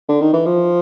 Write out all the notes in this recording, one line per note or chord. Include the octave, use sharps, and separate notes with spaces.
D3
D#3
E3
F3